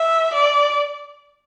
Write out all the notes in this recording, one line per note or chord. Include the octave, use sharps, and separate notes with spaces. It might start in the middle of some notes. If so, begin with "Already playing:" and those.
Already playing: E5
D5